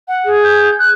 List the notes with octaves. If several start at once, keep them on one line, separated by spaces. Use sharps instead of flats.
F#5
G#4
G6
F#6